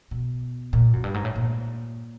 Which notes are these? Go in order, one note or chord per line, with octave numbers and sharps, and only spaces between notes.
B2
A#2
F#2
G2
G#2
A2
A#2